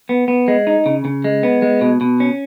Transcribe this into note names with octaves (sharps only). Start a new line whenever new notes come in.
B3
B3
G#3
D#4
C#3
C#3
G#3
B3
G#3
B2
B2
C#4